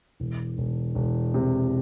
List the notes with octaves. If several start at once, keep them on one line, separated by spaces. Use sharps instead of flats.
E1
E1
E1
C3